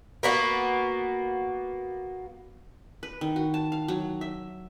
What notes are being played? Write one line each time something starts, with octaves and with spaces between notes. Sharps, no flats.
A#3 B3 F#4
B4
D#3
F#4
A5
F5
F#3
E5